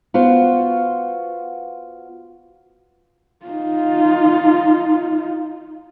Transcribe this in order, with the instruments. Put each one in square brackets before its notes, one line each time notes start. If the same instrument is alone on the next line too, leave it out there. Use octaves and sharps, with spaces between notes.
[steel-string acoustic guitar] B3 F4 F#4 C5
[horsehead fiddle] D#4 F4